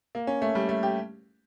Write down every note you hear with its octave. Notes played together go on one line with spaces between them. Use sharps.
A#3
C#4
A3
G3
A3
G4